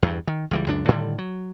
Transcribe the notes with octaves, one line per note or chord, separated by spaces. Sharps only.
E2 G2
D#3
C#2 E3 G3
C#2 F#2 D4
A2 D3 D#3 G3
F#3